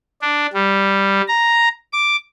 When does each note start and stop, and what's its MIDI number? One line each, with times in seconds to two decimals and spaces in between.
0.22 0.47 62
0.53 1.21 55
1.28 1.69 82
1.93 2.16 86